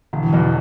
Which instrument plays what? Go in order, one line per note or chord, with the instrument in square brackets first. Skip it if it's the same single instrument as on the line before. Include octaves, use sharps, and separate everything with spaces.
[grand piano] E1 [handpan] D3
[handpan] E3
[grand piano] E2 B2 [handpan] F#3
[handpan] E3